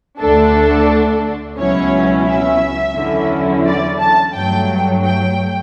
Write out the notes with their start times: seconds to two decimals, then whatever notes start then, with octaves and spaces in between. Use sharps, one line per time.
0.20 D2 D3 A3 D4 A4
1.57 C#2 B2 F#3 C#4 E4 C#5
2.26 E5
2.95 E2 D3 F#3 C#4 E4
3.65 D5
3.99 A5
4.33 G2 F#3 A3 G5
5.03 G5